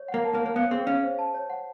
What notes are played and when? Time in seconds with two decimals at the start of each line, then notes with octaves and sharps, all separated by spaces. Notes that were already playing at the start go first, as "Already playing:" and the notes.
Already playing: C#5
0.08 F#5
0.14 A#3
0.25 A5
0.35 A#3
0.40 C#5
0.46 A#3
0.56 B3 F5
0.71 C4 G#4
0.87 C#4 F5
1.04 C5
1.19 A5
1.34 C#5
1.50 F#5